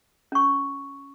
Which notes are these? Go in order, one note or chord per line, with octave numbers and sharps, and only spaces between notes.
C#4 C#6